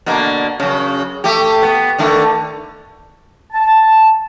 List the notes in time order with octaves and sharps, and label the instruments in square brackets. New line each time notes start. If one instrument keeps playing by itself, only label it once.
[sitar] B2 D3 A#3
F#2 C#3
A3 G4
B3
D3 D#3 A3
[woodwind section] A5